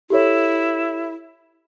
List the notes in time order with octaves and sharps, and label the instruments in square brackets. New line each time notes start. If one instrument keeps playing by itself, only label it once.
[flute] E4 [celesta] G4 A4 C#5